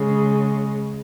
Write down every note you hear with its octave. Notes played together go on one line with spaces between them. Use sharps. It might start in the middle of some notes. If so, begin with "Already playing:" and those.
Already playing: C#3 G#3